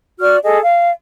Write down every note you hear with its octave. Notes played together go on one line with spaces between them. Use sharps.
F#4 D5 F6
G#4 A4 D#5
F5